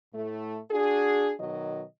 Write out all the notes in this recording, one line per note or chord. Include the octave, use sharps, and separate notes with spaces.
A2 A3
D4 F#4 G#4
B2 D#3 F#3 D#5